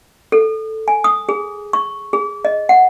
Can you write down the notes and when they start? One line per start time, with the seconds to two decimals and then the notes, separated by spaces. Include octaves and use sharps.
0.32 A4
0.88 G#5
1.04 D#6
1.29 G#4
1.73 C#6
2.13 G#4
2.45 D#5
2.69 F#5